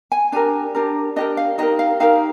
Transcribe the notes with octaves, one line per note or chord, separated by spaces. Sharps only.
G#5
D4 G4 A#4 G#5
D4 G4 A#4
D4 G4 A#4 D#5
F5
D#4 G4 A#4 D#5
F5
D#4 G4 A#4 F5